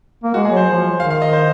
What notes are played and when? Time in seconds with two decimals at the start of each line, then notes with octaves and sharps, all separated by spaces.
0.24 A#3
0.34 G#3 F#4
0.45 G#4
0.50 F#3
0.56 C5
0.67 F3
1.00 D#3 F5
1.10 F5
1.22 D#5
1.33 C5